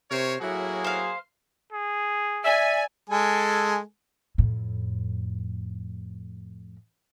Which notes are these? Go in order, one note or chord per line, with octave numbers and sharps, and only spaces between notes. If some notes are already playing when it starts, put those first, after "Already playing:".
C3 A#4 C5 C#5
A2 F#3 A#3 E4 F#4 G#4
C5 F5
G#4
D5 E5 G#5
G#3 A4 G#5
F2 A2